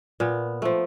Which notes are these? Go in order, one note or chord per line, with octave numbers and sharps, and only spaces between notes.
A#2 B3
F3 A3